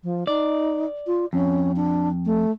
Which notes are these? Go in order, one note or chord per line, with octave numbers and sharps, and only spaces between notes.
F3
D#4 D5
F4
F2 C#4
D4
A3